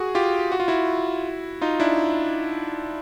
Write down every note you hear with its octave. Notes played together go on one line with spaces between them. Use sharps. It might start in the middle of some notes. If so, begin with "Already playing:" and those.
Already playing: F#4 G#4
F4 G4
F#4
F4
E4 F#4
D#4 F4
D4 E4